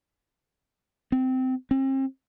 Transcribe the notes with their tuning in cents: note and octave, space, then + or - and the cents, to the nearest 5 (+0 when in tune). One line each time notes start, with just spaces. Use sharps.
C4 -20
C4 +40